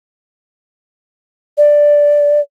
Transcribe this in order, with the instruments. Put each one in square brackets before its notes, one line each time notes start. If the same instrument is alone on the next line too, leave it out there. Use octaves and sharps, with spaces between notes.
[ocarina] D5